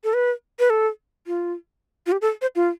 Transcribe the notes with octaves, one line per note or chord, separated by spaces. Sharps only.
A4
B4
B4
A4
F4
F4
G4
A4
C5
F4